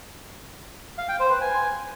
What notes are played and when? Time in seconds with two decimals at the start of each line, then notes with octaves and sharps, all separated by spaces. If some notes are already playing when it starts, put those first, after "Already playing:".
0.98 F5
1.09 G5
1.20 C5
1.30 B4
1.41 G#5